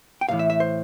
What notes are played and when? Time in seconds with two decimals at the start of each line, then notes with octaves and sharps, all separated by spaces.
0.21 G5
0.29 B1 A2 E3 F5
0.39 E5
0.50 E5
0.60 C5